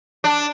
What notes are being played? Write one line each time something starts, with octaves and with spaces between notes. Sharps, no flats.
D4